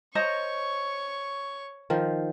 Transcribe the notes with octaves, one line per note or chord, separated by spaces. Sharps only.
C5 C#5 D#5 A#5 C#6
D#3 F3